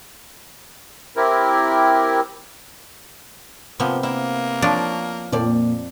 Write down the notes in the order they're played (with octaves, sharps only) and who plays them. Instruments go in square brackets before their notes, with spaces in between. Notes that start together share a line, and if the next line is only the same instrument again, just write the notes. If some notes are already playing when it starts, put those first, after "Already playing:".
[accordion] C4 E4 G4 A#4
[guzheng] C3 A#3 B3 [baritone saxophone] F3
[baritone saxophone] A#3 [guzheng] E4
[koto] F3 D4 [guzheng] C#5
[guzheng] F2 D5 [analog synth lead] A#2